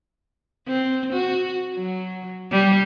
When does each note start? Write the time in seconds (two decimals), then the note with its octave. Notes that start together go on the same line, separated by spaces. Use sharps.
0.68 C4
1.13 F#4
1.73 F#3
2.51 G3